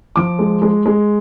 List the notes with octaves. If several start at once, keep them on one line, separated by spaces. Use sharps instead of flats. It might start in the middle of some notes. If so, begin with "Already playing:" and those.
F3 D6
G#3
G#3
G#3